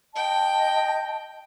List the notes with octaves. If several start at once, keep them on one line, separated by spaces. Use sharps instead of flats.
D#5 G5 A5